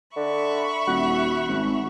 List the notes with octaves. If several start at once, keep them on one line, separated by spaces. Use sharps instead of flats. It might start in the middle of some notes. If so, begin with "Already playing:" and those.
D3 E5 B5 C#6
D#1 F#4
G#1